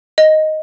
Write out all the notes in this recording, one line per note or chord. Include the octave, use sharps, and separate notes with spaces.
D#5